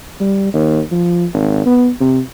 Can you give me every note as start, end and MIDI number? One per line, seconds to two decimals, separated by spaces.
0.20 0.50 55
0.54 0.79 39
0.91 1.25 53
1.33 1.64 32
1.66 1.89 59
2.00 2.19 48